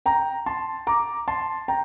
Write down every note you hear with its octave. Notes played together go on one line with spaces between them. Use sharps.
G5 A#5
A5 C6
A#5 D6
A5 C6
G5 A#5